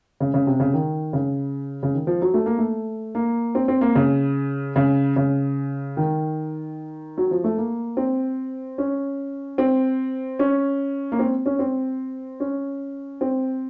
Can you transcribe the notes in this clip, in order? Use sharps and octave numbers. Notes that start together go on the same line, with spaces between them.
C#3
C#3
C3
C#3
D#3
C#3
C#3
D#3
F3
F#3
A3
A#3
A3
A#3
C4
C4
A#3
C#3
C#3
C#3
D#3
F#3
F3
A3
A#3
C4
C#4
C4
C#4
A#3
C4
C#4
C4
C#4
C4